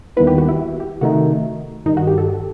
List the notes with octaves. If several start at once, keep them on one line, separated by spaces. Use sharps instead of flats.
D#2 D#3 G3 B3 E4 B4
G4
F#4
E4
G4
C3 D#3 A3 D#4 F#4
G2 D#3 G3 D#4
F#4
G4
A4